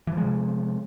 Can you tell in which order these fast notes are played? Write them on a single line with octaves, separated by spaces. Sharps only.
E3 F3 G#3 C3